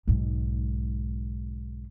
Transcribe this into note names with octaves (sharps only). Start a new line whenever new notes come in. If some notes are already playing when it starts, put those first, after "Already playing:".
B1 G#2